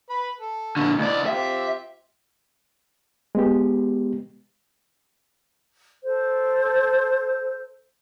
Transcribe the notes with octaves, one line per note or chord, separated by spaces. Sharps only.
B4 B5
A4
A#2 D3 A5 C#6
C#2 E3 D4 D5 D#5
C4 F4 G4 E5
G#3 B3 G4
A4 C5